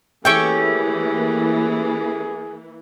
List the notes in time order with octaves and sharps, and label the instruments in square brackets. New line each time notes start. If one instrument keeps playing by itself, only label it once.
[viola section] E3 A#3 [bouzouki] A3 C#4 G4 [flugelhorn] G#4 [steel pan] G5 C#6